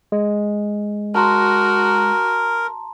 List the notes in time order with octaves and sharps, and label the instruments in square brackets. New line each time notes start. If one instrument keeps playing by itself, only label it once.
[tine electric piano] G#3
[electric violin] F#4 [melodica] A#4 [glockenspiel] A5 A#5 C6